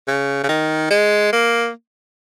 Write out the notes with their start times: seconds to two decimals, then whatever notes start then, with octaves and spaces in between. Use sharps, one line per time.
0.08 C#3
0.44 C#3
0.49 D#3
0.91 G#3
1.33 A#3